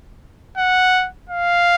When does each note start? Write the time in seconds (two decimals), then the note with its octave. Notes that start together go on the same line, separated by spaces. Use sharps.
0.57 F#5
1.30 F5